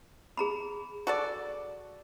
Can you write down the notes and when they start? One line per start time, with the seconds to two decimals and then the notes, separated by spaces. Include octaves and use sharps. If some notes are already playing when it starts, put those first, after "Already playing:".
0.37 G#4 A#5 B5
1.07 F#4 A4 D5